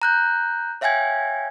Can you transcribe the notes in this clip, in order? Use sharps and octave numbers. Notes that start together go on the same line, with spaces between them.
A#5 F#6 G6
C#5 E5 F5 G5 G#5 G#6